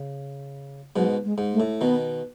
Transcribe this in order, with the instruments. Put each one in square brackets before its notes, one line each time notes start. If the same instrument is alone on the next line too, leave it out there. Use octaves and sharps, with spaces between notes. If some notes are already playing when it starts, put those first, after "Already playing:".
Already playing: [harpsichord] C#3
[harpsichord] G#2 B2 [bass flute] F#3
[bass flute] G#3
[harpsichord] G#2
[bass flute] A3
[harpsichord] A2
[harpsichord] B2 D#3 [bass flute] B3